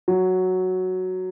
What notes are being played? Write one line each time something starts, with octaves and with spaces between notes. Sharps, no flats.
F#3